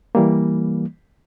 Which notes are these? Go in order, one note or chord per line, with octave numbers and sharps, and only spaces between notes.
E3 G3 A#3